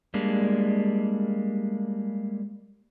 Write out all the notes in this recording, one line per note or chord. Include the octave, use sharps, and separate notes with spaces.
G3 G#3 A#3 D4